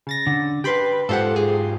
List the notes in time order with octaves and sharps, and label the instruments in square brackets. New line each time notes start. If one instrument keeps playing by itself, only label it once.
[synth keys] C#3 A6 A#6
[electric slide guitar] D3
[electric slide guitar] G4 B4 [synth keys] G5 B5 C6
[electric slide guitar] G#2 F4 G4 [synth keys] A4 C5 F#5
[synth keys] G#4